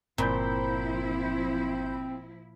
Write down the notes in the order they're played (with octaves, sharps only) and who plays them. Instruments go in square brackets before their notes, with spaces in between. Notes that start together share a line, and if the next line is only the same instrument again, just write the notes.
[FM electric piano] G1 B5 G6 [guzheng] A#2 [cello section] F3 E4 [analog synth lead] C4